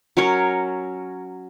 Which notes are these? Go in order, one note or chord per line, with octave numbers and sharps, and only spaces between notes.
F#3 C#4 A#4 C#5